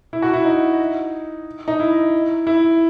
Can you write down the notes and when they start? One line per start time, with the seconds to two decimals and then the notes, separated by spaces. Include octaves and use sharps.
0.13 E4
0.22 F#4
0.33 E4
0.45 D#4
1.68 D#4
1.80 E4
2.47 E4